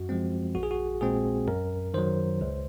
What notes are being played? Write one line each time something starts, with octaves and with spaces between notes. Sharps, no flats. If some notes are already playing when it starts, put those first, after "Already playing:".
Already playing: F#2 F#4
F3 G#3 C4
A#1 F#4
G#4
F#4
A#2 G#3 C4 G#4
F#2 A#4
D#3 F#3 C5
C#2